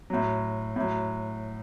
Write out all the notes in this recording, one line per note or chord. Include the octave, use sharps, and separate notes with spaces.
A2 F#3
A2 F#3